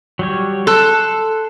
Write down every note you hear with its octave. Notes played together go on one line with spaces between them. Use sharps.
F#3 G3 C#5
A4 C6 F#6